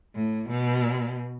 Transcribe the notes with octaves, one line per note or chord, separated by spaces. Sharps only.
A2
B2